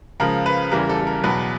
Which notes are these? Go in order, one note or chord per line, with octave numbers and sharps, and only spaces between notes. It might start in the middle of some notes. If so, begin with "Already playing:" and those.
C#2 C#3 F3 A#4
B4
E2 C#3 E3 G3 A#4
A4
A4
A#4
E2 B2 F#3 B4